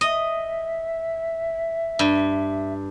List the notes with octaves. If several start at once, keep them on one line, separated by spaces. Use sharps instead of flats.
D#5 E5
G2